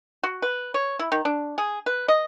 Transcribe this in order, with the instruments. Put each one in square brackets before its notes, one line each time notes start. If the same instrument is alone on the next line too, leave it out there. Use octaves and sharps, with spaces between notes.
[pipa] F#4
B4
C#5
E4
D#3
D4
G#4
B4
D#5